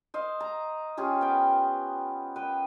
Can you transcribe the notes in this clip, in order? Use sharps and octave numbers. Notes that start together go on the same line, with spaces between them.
C5 D#5 F5
A#5
C#4 F4 G4 G#4
B3 G5
B4 G5